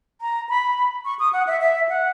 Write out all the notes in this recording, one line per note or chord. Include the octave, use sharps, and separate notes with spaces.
A#5
B5
C#6
D#6
F#5
E5
E5
F#5